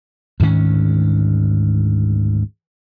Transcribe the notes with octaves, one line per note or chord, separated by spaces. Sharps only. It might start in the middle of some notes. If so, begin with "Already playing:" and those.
D2 G#2 D#3 C#4